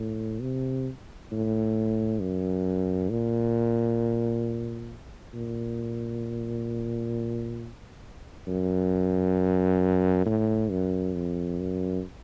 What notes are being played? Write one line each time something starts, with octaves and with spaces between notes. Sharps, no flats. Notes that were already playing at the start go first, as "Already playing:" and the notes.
Already playing: A2
C3
A2
F#2
A#2
A#2
F#2
A2
F#2
F2
F#2